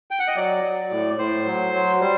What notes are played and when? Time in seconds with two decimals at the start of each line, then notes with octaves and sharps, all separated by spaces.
0.11 G5
0.19 F#5
0.28 D#5
0.36 F#3 D5
0.63 F#3
0.91 A2
1.18 A2 C5
1.46 F#3
1.73 F#3
2.00 G3 C5